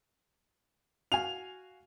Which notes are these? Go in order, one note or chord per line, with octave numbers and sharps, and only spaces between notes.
F#4 F5 G#5 F7